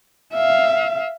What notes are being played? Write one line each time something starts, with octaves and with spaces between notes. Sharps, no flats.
E5 F5